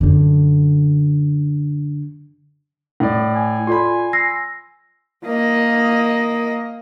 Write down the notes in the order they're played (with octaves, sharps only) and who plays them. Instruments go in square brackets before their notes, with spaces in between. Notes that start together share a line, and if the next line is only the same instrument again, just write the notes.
[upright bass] F#2 D3
[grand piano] A2 D5
[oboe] G#5
[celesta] F4 A4 D5 [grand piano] B5 C6
[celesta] E6 A#6 C7
[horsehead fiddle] A#3 D#5